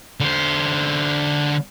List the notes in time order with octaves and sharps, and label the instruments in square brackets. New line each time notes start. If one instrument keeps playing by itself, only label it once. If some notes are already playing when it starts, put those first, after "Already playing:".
[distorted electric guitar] D3 C5